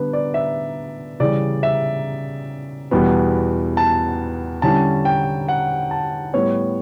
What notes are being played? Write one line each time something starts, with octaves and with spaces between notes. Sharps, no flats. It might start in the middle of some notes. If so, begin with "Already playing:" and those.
Already playing: D3 G3 B3 D4 B4
D5
E5
C#3 E3 G3 D5
E5
E2 B2 G3 B3
A5
D3 G3 C#4 E4 A5
G5
F#5
A5
A2 G3 B3 C#5